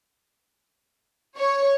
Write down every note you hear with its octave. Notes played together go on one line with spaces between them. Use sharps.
C#5